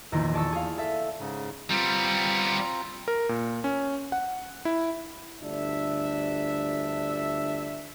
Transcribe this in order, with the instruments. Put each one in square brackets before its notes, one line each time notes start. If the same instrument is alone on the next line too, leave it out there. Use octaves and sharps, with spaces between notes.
[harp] A#1 E2 D#3 A#6
G#4 D5 A5 C#6 E6
G#4 F5
A4 E5
[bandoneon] G#2 C#3
[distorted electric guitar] G3 B3 [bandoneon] C4 F4 A#5
[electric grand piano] A#4
A#2
C#4
F#5
E4
[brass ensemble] G1 D2 D4 E5